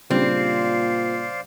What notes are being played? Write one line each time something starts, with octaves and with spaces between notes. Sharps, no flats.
A#2 C#3 G3 C4 D4 C5 D5 F5